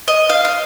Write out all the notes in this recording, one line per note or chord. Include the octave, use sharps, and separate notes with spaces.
D#5
F5
F5